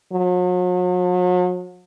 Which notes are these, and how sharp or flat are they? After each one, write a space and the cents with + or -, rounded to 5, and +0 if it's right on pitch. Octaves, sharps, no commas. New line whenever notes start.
F#3 -40